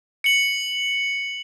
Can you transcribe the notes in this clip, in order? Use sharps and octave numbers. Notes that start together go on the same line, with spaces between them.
C#7 F#7